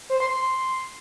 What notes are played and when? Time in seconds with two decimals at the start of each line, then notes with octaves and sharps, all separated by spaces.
0.10 C5
0.20 C6
0.31 C6